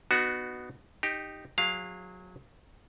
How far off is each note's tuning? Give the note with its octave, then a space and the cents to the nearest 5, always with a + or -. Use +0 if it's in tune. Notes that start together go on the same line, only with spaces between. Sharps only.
B3 +0 D#4 -40 F#4 +0
D#4 -10 G4 +0
F#3 -25 G#4 -35 F5 +0